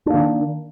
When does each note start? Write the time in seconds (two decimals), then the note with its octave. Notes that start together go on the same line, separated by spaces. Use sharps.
0.06 D4
0.10 A#3
0.14 D#3